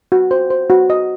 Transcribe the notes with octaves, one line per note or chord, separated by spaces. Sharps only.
F#4
C5
C5
F#4
D#5